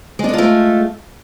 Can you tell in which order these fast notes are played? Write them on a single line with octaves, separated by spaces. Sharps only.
G#3 D4 A4 F4 A3